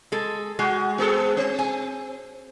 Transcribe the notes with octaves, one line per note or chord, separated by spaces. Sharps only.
G#3 A4
G#3 F#4
B3 G#4 A4
C4
G#5